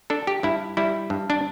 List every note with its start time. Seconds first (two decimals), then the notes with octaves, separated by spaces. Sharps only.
0.10 D4 A4
0.27 G4
0.43 G2 E4
0.77 G3 E4
1.10 G2
1.30 D4